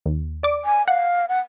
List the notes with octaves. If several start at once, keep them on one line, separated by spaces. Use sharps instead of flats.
D#2
D5 D6
G#5
F5 F#5
F#5